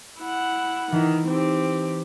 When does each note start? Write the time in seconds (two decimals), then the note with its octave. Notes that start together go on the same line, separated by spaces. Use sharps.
0.19 E4 F#5
0.92 D#3 E3 D#4 E4
1.28 C4 G4